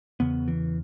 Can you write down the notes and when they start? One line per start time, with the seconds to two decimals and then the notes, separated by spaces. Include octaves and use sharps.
0.20 E2 C#3 B3
0.48 E3